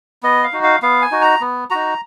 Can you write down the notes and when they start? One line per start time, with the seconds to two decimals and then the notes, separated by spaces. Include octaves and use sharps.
0.23 B3 D#5
0.43 F5
0.53 D#4 F#4
0.63 F5
0.82 B3 F5
1.02 G#5
1.11 D#4 F#4
1.22 A#5
1.41 B3
1.70 D#4 F#4 A#5